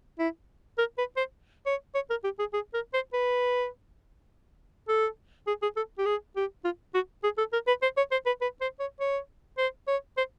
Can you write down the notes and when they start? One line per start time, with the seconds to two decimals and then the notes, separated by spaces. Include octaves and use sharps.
0.19 E4
0.78 A#4
0.98 B4
1.16 C5
1.66 C#5
1.94 C#5
2.10 A#4
2.24 G4
2.39 G#4
2.53 G#4
2.74 A#4
2.93 C5
3.13 B4
4.88 A4
5.47 G#4
5.62 G#4
5.76 A4
5.98 G4
6.06 G#4
6.36 G4
6.64 F4
6.94 F#4
7.23 G#4
7.38 A4
7.53 A#4
7.67 B4
7.82 C5
7.97 C#5
8.11 C5
8.26 B4
8.41 B4
8.61 C5
8.80 C#5
9.00 C#5
9.58 C5
9.87 C#5
10.17 C5